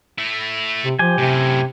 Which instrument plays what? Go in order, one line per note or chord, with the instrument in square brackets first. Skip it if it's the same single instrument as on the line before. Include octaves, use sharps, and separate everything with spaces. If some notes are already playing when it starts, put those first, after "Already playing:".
[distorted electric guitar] A3 E4
[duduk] C3
[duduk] F3 [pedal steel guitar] G4 G#5
[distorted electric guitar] F#2 A2 [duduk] C3